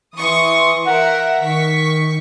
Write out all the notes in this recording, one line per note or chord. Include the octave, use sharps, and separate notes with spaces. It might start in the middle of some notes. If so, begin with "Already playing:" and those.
E3 C6 C#6 D#6
A#4 E5 F#5
D#3 C#6 B6